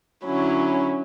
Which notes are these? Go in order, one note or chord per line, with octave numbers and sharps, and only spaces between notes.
D3 F#3 C#4 E4